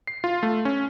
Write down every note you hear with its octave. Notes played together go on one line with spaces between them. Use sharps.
C7
F4
A3
C#4